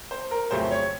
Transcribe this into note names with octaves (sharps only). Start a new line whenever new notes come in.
C5
A#4
F2 C#3 F#3 A3 C5
C#5